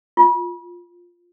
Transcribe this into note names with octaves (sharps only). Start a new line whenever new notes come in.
F4